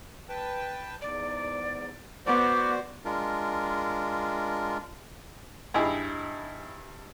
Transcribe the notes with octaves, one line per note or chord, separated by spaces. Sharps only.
B4 G5 A5
E2 G#2 D5
B3 F#4 C5 D5 D6
G#3 D4 F4 A#4
G2 D#4 E4 G#4 B5